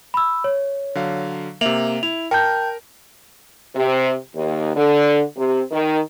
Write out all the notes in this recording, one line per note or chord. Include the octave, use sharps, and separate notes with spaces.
B5 E6
C#5
D3 F#3 F5
C3 A#3 E5 F7 F#7
E4 F7
A#4 G5 A5 G6
C3
D#2
D3
C3
D#3